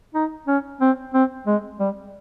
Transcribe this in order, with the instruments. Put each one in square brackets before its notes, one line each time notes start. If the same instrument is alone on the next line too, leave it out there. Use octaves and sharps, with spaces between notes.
[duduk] D#4
C#4
C4
C4
G#3
G3